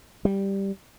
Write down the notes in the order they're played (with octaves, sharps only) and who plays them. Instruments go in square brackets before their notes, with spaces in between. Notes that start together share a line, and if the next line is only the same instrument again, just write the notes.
[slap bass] G3